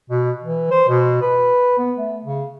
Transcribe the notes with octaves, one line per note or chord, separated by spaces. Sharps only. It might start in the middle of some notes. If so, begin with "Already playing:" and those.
B2
E3
C5
B2
B4
B3
A3
C#3